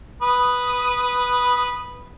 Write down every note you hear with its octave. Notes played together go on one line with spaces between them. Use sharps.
B4 D#6